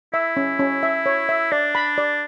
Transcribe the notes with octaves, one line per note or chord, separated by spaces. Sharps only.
E4 E5
C#4
C#4
E5
C#5
E5
D4 D5
B5
D5